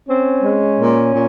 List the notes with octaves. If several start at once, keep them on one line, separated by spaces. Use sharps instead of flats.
C4 C#4
G#3
A#2
A#2